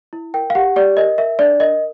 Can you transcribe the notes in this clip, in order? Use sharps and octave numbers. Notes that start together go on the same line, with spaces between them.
E4
A#4 G5
F5
G4 F#5
G4 D5
A#4 D#5
A#4 E5
D4 D5
A#4 D#5